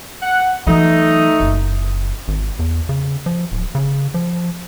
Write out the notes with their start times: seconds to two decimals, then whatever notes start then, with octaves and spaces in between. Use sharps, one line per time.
0.23 F#5
0.67 E3 F#3 A3 D#4
1.40 F#1
2.28 G#1
2.59 E2
2.89 C#3
3.26 F3
3.52 D1
3.75 C#3
4.14 F3